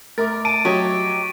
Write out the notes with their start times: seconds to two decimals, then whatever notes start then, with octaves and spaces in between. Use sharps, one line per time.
0.18 A3 A#4 E5 D6 A6
0.45 A5 D7 D#7
0.65 F#3 G4 C#5 D#5